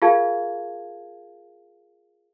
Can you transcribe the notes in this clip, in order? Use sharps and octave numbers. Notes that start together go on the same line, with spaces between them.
F4 G#4 A#4 F5 A5 G#6